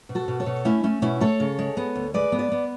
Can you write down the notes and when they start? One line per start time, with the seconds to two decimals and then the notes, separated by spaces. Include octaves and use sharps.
0.09 B2
0.15 F#4 A4
0.28 B2
0.40 A4 C#5
0.46 B2
0.65 A3 C#4 E4
0.84 A3 C#4
1.02 B2 C#4 E4
1.20 A3 A4 C#5
1.40 C#3
1.59 G#3
1.77 B3
1.96 D2
2.14 G#3 B4 D5
2.32 B3
2.39 B4 D5
2.52 B3